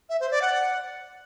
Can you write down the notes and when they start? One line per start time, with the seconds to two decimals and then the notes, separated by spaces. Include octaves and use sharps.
0.09 E5
0.20 C5
0.31 D5
0.42 F#5